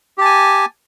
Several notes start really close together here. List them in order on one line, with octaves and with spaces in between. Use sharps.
G4 A5 G#5